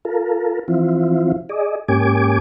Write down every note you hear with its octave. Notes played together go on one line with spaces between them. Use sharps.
F4 A4 A#4
E3 F3 C4 E4 F4
G#4 D5 D#5
G#2 A#3 C#4 G4 G#5 D6